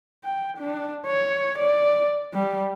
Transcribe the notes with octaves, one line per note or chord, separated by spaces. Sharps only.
G5
D4
C#5
D5
G3